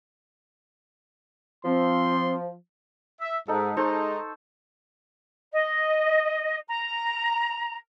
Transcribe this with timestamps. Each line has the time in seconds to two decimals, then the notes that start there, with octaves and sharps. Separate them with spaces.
1.65 F3 C4 C6
3.21 E5
3.48 G#2 D#4 A4
3.77 G#3 D#4 A4 C5 C#6
5.52 D#5
6.68 A#5